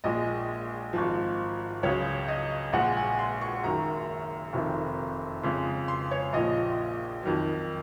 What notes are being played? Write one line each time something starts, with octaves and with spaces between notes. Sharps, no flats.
A#1 A#2 G#3 D#5
G#1 G#2 F3
C#2 C#3 F#3 C#5
D#5
A#1 A#2 G#3 F#5
G#5
C6
C#6
F#1 F#2 D#3 A#5
F1 F2 C3 D#3
F2 C#3 G#3 C6
C6
C#5
A#1 A#2 F3 D#5
F2 D#3 F#3